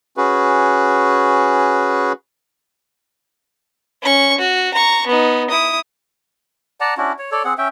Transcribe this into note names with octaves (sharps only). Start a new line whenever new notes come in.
C#4 F#4 G#4 B4
C#4 C#6
F#4
A#5 C#6
B3 D#4
E4 D#6
D5 F#5 A5 A#5
C#4 D4 E4 F#4
C#5
A4 C#5 D5
C4 G#4 F#5
C#4 E5 G5